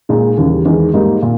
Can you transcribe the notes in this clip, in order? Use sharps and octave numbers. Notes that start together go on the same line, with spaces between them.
A#2 G#3 D#4
D#2 C#3 E3 G3
E2 D#3 G#3 D#4
G#2 G3 A#3 D#4 A#4
A#2